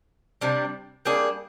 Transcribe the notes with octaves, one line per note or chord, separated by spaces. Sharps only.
C3 G3 D4
G3 A#3 D4 G#4